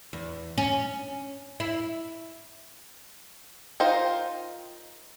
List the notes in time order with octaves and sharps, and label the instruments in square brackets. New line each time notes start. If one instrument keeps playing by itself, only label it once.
[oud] E2
C#4
E4
[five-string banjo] D#4 F4 A#4 C5 G5